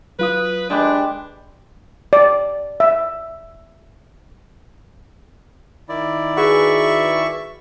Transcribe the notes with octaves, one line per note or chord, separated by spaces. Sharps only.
F#3 F4 B4 D#6
G#3 D4 G4 B4
D5
E5
D#3 E4 D5
F#4 G#4 B4 E5 C#6